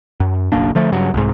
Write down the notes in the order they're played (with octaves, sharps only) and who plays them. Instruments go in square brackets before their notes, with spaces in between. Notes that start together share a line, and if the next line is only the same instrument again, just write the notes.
[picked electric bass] F#2
F#1 B1 A#3 D4
D3 F3 A3
G2 C#3 F#3
C2 G#2